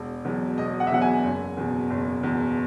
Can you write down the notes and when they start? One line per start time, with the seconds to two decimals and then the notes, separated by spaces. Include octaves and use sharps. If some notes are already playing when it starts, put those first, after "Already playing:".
Already playing: E1
0.25 E2 B2 F#3
0.58 E1 D#5
0.80 F#5
0.87 E5
0.91 E2 B2 F#3 F#5
1.02 G#5
1.24 F#1
1.57 E2 B2
1.90 F#1
2.23 E2 B2